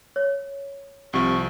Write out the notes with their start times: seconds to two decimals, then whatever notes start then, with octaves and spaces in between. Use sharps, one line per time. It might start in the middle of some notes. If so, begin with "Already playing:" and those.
0.16 C#5
1.13 C2 C3 F3 C#6